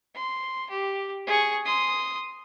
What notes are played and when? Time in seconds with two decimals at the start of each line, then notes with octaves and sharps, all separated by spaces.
0.15 C6
0.70 G4
1.27 G#4 C#6
1.65 C6 D#6